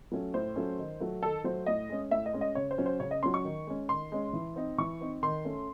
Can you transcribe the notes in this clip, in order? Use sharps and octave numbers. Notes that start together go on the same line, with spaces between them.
F#3 A3 C#4
A2 C5
F#3 A3 C#4
D#3
F#3 A3
D#3 A4
F#3 A3 C5
A2 D#5
G#3 C#4
A2 E5
D#5
G#3 C#4
D#5
C#3 C#5
C5
F#3 C#4
C5
C#3 C#5
D#5
F#3 C#4 C6
C#6
D#3
G#3 C#4
D#3 C6
G#3 C#4
E3
C4 D#4
E3 C#6
C4 D#4
D#3 C6
A3 C#4